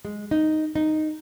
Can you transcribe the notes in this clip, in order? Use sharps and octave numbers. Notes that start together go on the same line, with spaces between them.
G#3
D#4
D#4